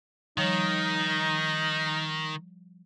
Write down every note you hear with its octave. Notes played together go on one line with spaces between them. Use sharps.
D#3 F3 G3 D#4 C#5